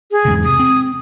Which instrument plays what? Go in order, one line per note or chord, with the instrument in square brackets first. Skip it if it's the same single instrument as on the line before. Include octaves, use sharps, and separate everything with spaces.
[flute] G#4
[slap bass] E2 G#2 C#3
[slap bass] C3 [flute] D#6
[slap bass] C4